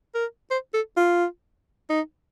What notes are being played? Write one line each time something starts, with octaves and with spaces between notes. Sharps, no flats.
A#4
C5
A4
F4
D#4